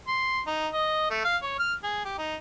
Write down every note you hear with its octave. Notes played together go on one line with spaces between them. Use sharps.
C6
D#4
D#5
A3
F5
C#5
F6
G#4
G4
D#4